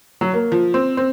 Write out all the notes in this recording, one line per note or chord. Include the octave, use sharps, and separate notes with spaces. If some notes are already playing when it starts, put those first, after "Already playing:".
F#3
A#3
F3
C4
C4